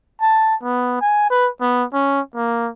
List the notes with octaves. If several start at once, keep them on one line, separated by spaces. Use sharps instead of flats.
A5
B3
G#5
B4
B3
C#4
A#3